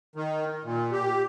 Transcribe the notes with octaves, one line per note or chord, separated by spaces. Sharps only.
D#3
A#2
G4